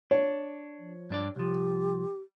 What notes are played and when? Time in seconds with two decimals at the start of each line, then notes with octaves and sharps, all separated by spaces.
0.11 D4 C#5
0.79 F3
1.10 G2 D4 D5
1.36 C2 F3 G4